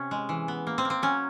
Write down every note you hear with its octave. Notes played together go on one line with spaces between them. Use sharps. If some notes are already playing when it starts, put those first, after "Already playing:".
Already playing: C3 C#4
G#3
E3
B3
A#3
C4
A#3
C4
F#3 C#4